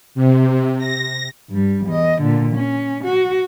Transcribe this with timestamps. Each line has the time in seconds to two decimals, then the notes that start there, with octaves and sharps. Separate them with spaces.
0.15 C3
0.78 A#6
1.50 G2 G3
1.86 E2 D#5
2.21 A#2 D3
2.55 C#4
3.04 F#4